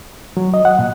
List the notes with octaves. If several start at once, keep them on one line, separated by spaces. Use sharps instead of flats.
F#3
D#5
F#5
A#2